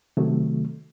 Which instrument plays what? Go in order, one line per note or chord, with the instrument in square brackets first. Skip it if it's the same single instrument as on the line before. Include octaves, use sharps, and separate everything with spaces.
[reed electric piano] C3 D#3 F#3 A3